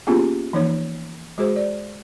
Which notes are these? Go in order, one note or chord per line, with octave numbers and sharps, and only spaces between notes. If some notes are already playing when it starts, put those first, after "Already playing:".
A#3 B3 C#4 F4 G4 G#4
E3 F3 A#3 D#4 C#5
G#3 F#4 G#4 C5
D5